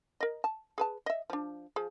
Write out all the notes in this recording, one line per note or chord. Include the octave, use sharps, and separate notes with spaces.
A#4 D#5
A5
G#4 B4 A5
D#5 E5
F3 D4
F3 G#4